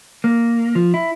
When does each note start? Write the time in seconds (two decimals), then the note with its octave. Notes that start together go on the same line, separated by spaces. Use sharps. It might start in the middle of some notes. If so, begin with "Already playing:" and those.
0.24 A#3
0.75 F3
0.94 E4